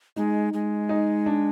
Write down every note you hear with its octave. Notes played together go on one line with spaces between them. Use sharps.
G#3 D#4
G#3
D#4
D4